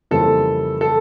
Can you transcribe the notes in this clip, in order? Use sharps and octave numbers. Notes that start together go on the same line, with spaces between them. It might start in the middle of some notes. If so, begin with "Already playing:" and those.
F2 C#3 E3 G3 A#3 A4
A4